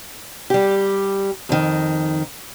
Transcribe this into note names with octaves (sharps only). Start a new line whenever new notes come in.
G3 G4
F2 D#3